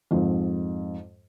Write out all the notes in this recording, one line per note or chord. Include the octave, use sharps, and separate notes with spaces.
F2 G#2